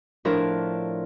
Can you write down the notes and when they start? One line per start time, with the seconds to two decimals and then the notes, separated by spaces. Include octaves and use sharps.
0.25 A2 F3 D4 E4 A#4